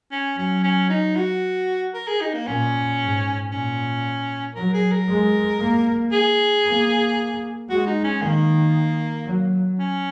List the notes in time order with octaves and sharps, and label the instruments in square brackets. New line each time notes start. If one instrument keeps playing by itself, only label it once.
[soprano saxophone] C#4
[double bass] F#3 [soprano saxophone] C#4
[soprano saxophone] C#4
D#4
F#4
A#4
G#4
D#4
A#3
[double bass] A#2 [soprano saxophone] C#4
[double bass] G#2
[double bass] A#2 [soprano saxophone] C#4
[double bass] F#3 [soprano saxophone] A#4
[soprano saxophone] G#4
A#4
[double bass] G#3
A#3
[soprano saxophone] G#4
[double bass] A#3
[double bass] G#3 [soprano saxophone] F#4
[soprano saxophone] D#4
C#4
[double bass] D#3 [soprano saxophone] A#3
[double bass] F#3
[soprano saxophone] C#4